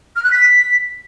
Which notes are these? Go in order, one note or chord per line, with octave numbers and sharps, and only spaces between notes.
F6
F#6
B6